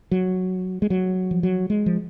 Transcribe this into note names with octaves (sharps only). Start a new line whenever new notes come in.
F#3
G#3
F#3
F3
F#3
G#3
F3